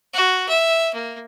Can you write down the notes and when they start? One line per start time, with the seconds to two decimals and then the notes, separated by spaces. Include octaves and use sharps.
0.14 F#4
0.49 E5
0.95 A#3